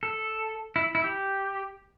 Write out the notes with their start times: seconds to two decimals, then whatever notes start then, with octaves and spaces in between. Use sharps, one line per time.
0.03 A4
0.76 E4
0.95 E4
1.04 G4